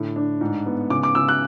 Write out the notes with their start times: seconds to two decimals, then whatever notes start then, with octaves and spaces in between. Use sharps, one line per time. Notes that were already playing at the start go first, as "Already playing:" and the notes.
Already playing: A2 D3
0.16 D4
0.41 G#2
0.66 B3
0.90 C#3 D6
1.03 D6
1.15 C#3 E6
1.28 F#6